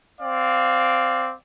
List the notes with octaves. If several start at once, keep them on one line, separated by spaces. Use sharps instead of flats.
C4 D5 F5